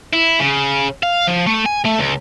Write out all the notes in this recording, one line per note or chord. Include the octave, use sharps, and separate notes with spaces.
E4
C#3
F5
F3
A3
G#5
A3
C#2